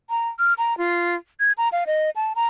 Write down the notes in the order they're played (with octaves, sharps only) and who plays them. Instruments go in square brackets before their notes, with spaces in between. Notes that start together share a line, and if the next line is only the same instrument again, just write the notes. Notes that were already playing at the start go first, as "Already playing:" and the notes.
[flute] A#5
F6
A#5
F4
G#6
A#5
F5
D#5
A5
A#5